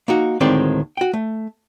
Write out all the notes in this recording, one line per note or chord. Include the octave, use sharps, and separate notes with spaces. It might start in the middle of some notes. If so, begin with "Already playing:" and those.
A#3 D#4 F#4
D2 A2 D#3 G#3 C4 D5
F#4 G5
A3